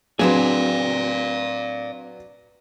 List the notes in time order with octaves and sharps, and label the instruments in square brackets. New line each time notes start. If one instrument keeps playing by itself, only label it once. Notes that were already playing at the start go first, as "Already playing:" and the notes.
[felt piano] F#3 B4 [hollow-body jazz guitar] C4 D4 G#4 [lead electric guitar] D5 F5